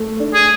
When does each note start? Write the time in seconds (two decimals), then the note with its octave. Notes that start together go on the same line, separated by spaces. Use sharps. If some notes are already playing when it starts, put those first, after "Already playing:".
Already playing: A3
0.20 D4
0.34 G#4